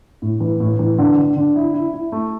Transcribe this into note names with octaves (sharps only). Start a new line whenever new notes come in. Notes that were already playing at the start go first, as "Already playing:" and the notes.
A2
E3
A2
E3
D3
D3
D3
E4
E4
E4
A3